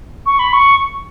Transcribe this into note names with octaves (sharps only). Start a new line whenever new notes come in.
C#6
B5
C#6